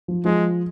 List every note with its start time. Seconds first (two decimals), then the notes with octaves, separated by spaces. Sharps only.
0.08 F3
0.25 F3 G#3